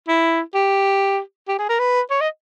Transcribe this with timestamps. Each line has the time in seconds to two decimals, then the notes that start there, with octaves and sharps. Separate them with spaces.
0.08 E4
0.54 G4
1.48 G4
1.59 G#4
1.69 A#4
1.79 B4
2.11 C#5
2.21 D#5